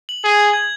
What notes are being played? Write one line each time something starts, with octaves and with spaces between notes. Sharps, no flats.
F#7
G#4 F#7
G#6
G#6